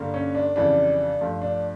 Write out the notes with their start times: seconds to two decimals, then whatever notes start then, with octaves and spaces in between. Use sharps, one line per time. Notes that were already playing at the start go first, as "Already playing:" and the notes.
Already playing: G2 D3 G3 A#3
0.14 C#4
0.35 D4
0.56 F2 C#3 E3 G3 D4
1.21 G2 F3 A3
1.42 D4